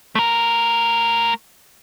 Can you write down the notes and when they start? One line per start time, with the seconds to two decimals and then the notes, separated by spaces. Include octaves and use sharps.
0.15 A3 A#4